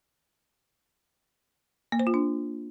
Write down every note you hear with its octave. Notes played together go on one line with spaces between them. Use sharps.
A#3
C5
F4
D4